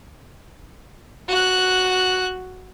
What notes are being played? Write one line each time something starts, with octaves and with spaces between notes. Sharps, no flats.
F#4 F#6